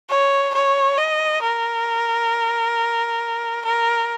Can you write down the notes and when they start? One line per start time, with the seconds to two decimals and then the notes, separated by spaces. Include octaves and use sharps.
0.09 C#5
0.54 C#5
0.98 D#5
1.42 A#4
3.65 A#4